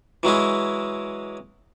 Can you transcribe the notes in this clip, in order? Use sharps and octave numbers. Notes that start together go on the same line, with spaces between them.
E3 F#3 G#3 E4